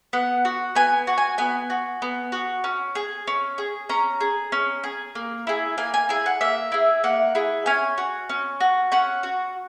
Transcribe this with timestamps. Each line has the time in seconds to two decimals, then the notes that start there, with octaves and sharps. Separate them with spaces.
0.13 B3 F#5
0.45 F#4
0.75 B3 G#5
1.07 F#4
1.18 G#5
1.38 B3 G#5
1.70 F#4
2.02 B3
2.32 F#4
2.64 C#4
2.95 G#4
3.27 C#4
3.58 G#4
3.89 C#4 A#5
4.20 G#4
4.52 C#4
4.84 G#4
5.15 A#3
5.47 E4 G#4
5.78 A#3 G#5
5.94 G#5
6.09 E4 G#4 G#5
6.26 F#5
6.41 A#3 E5
6.72 E4 G#4
7.04 A#3 F#5
7.35 E4 G#4
7.66 C#4 G#5
7.98 F#4
8.29 C#4
8.60 F#4
8.92 C#4 F#5
9.23 F#4